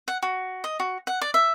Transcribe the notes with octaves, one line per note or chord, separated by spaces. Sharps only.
F#5
F#4
D#5
F#4
F#5
D5
E5